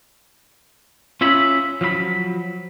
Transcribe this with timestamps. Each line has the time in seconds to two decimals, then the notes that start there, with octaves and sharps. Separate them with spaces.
1.21 C#4 F4 C#5 E5 B5
1.81 F3 F#3 E5 B5